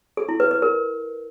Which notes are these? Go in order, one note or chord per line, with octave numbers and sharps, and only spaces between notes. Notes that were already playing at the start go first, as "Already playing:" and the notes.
A4
E4
B4
B4
A#4